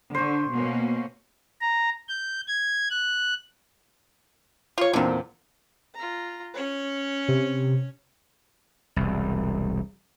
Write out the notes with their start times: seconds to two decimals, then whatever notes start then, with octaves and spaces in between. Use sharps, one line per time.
0.15 D3 C5 C#6
0.51 B2 A#3 C#4
1.61 A#5
2.08 G6
2.48 G#6
2.90 F#6
4.78 F4 C#5
4.93 E2 A#2 D3 D#3 C4
5.94 F4 A#5
6.54 C#4 C#5
7.28 C3
8.96 E1 C2